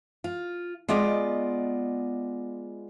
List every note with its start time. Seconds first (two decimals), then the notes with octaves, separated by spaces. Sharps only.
0.24 F4
0.88 G#3 B3 F4 D5 D#5